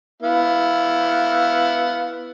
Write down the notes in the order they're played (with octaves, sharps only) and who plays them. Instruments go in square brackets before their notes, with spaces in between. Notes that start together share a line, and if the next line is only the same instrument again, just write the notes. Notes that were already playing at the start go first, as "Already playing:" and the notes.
[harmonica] B3 E4 F5